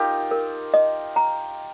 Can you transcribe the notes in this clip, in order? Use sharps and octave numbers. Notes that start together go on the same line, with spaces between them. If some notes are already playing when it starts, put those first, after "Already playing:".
Already playing: D#4 F4 G4 A#4
A#4
D#5
A#5